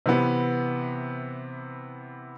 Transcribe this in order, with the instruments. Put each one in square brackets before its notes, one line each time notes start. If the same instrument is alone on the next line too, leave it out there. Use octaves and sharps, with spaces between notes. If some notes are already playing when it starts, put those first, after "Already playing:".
[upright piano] C3 E3 B3